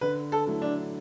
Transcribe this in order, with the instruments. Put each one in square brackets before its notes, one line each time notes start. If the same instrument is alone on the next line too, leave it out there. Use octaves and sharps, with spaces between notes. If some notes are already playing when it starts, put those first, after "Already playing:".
[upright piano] D3 [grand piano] B4
[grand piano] A4
[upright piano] F#3 A3 E4
[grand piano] D4